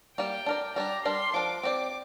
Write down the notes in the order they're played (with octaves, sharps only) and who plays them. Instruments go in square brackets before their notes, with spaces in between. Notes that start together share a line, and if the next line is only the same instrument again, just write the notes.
[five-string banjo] G3 A#3 G4 D5 [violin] G5
[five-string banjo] D4 A#4 D5
[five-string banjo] G3 D4 G4 [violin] A#5
[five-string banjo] G3 D4 A#4 D5 [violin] C6
[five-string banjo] F3 D4 A#4 [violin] D6
[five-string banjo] C4 G4 D5 [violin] D6